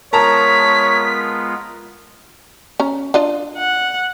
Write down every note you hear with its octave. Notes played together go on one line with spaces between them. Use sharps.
G#3 B3 F4 A#4 C#5 A5 A#5 B6
C#4 A#5
D4 F4 D#5
F#5